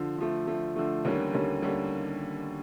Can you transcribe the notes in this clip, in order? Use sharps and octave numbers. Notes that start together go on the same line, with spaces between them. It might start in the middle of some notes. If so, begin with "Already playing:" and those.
Already playing: D3 F3
D3 F3 A3
D3 F3 A3
D3 F3 A3
D#2 D3 G3 A#3 C#4
D#2 D3 G3 A#3 C#4
D3 G3 A#3 C#4